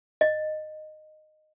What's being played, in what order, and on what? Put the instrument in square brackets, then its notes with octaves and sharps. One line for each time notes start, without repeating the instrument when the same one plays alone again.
[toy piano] D#5